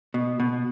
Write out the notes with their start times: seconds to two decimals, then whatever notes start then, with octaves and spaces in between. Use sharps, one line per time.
0.14 B2
0.40 B2